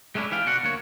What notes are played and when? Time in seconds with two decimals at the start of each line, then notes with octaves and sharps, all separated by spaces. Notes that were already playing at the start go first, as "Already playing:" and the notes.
0.15 G#3 A3 C#4 D4 E4
0.31 E3 G3 E4 G#4 F5 G5
0.45 B2 D3 D4 F#4 F#5
0.63 D2 A#3 C#5